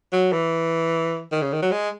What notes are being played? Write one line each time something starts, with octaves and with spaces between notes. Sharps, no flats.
F#3
E3
D#3
C#3
D#3
F#3
G#3